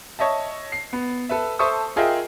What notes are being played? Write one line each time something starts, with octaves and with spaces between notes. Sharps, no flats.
C#5 D#5 E5 A5
C7
B3
A4 B4 E5
A4 C5 E5 A5 C#6 D#6
F4 G#4 A#4 D#5 E5 G5